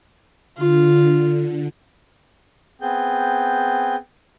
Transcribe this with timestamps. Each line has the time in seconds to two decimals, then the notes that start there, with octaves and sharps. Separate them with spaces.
0.57 D3 F4
2.81 B3 C4 G#4 G6